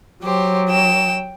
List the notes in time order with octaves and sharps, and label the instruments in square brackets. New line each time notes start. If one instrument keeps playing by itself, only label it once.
[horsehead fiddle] F#3 [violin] G4 C5
[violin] G5 E7